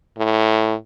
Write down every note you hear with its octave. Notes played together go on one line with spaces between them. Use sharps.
A2